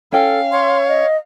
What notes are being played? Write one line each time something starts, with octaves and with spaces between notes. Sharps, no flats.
C#4 A4 F5 G5
C#5 C6
D#5